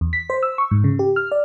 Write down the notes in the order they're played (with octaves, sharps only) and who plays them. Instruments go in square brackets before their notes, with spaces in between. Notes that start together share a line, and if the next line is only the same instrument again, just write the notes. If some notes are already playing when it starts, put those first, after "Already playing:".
[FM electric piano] E2
B6
C5
E6
C#6
G#2
C#3
G4
F6
D5